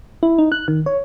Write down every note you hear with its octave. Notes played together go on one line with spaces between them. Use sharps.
E4
D#4
F#6
D#3
C#5